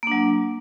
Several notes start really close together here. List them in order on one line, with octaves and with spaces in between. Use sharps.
A#3 D4 F#3